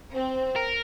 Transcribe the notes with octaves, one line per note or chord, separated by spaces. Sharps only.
C4
A#4